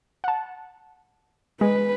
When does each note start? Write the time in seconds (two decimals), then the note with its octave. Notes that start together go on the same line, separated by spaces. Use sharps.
0.24 F#5 A5
1.61 G#3 B4